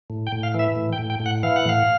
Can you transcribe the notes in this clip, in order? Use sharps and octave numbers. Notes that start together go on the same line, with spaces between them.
A2
G5
A2
F5
E3 E5
A2
G5
A2
G5
A2
F#5
E3 F5
F#5
A2 F5